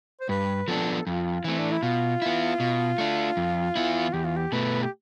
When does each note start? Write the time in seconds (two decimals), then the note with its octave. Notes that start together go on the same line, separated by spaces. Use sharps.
0.21 C5
0.29 G2 B4
0.68 F3 B3 D4 A4
1.06 F2 F4
1.44 E3 A3 C4
1.59 D4
1.71 E4
1.83 B2 F4
2.22 B3 E4
2.60 B2
2.98 A3 D4
3.37 F2
3.76 E3 B3 E4
4.13 E2 G4
4.24 F4
4.36 G4
4.52 B2 A3 B4
4.83 G4